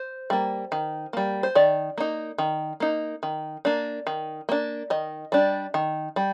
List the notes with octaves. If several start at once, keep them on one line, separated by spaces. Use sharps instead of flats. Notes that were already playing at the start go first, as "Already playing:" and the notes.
Already playing: C5
G3 A#3
D#3
G3 A#3
C5
D#3 D5
A#3 D#4
D#3
A#3 D#4
D#3
A#3 D4
D#3
A#3 D4
D#3 D#5
G3 D4
D#3
G3